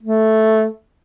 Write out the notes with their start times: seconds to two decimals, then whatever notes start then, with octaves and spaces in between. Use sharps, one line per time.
0.03 A3